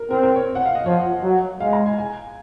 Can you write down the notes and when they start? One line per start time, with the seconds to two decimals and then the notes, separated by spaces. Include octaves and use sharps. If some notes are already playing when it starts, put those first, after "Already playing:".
Already playing: A#4
0.11 C4 A#4
0.23 A#4
0.36 C#5
0.55 F#5
0.66 F5
0.75 D#5
0.86 F3 C#5
1.24 F#3
1.60 G#3 F5
1.73 A#5
1.86 G#5
1.99 G#5